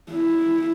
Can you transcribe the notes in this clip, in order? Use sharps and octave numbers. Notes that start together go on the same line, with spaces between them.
E4